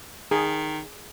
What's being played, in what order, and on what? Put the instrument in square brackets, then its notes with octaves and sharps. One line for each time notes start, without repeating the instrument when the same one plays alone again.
[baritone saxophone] D#3 [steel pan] G#4